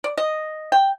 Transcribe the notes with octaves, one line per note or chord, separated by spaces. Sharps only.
D5
D#5
G5